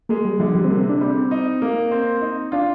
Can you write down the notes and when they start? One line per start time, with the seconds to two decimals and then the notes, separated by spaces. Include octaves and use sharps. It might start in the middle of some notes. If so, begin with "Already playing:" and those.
0.09 G#3 A#3
0.25 G3
0.39 D3 F3
0.55 G3
0.64 C4
0.70 C3 A#3
0.89 D4
1.01 G3 C4
1.16 C4
1.31 D#4
1.62 A#3
1.91 C4
2.21 D#4
2.52 D4 F4